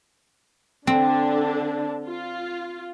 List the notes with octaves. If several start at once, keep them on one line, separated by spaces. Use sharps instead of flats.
D3 C4 D4
F4